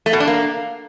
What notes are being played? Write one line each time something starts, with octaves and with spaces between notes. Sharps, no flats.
A3
B2
D4
A#3